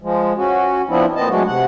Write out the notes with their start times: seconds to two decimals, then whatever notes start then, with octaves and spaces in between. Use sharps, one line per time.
0.02 F3 G#3
0.37 C#4 F#4
0.89 F3 B3 C4 D4 E4
1.16 A#2 B3 C4 D#5 A5
1.29 F#3 G#3 A3 D4 F#4
1.46 C3 F#5